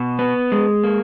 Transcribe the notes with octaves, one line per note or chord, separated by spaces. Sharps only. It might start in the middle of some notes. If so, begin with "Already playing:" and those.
Already playing: B2
B3
G#3
A#3